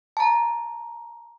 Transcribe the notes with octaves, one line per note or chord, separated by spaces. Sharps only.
A5 A#5